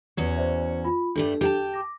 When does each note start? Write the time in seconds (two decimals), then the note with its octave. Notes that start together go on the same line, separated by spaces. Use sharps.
0.17 E2 C#4 F#4
0.37 C5 D5 E5
0.85 F4 B5
1.16 G2 G3 A3 D4 A4
1.41 G4 F#5 A5
1.73 D6 A#6